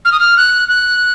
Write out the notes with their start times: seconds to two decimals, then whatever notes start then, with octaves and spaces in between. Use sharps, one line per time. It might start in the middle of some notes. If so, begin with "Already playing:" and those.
0.05 F6
0.12 D#6
0.20 F6
0.37 F#6
0.69 F#6